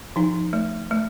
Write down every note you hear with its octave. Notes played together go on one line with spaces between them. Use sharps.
F3 D#4
A3
A3